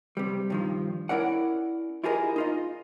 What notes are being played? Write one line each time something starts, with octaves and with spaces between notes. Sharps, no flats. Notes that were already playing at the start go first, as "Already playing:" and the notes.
C3 G3
G2 D#3 F3
C#4 E4 A#4 D5 F#5
E4 F4 G4 G#4 A#4 D#5
D#4 F4 D#5